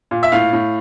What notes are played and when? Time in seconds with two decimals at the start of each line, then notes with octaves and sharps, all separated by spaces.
0.11 A#2
0.23 E5
0.32 A2 F5
0.53 A2